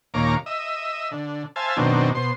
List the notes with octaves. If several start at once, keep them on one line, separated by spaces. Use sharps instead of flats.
D#2 A#2 C#5 F5 A#5 D6
D#5 E5
D3
C5 E5 F5 G#5 A5
F#2 B2 D#3 C4 D4
B2 C5 C6